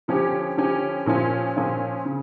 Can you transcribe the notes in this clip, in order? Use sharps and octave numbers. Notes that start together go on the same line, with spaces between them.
D3 F3 C#4 G4
D3 F3 C#4 G4
A#2 F3 C#4 F4
A#2 F3 C#4 F4
C#3